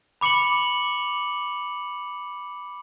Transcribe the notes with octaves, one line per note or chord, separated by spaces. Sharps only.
B5 D6 C#7 F7 F#7